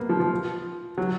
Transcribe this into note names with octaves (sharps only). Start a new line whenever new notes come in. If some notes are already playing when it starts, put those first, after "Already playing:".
Already playing: A#3 B3
F3
F3
F#3